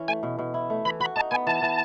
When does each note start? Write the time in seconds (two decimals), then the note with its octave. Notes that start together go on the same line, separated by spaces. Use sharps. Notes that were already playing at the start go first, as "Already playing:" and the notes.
Already playing: E3 C#4
0.08 A3 G#5
0.23 B2
0.39 B2
0.54 E4
0.70 A3
0.85 E3 B5
1.00 F#4 B5
1.16 D#4 A5
1.31 B3 G#5
1.47 E3 A5
1.62 E3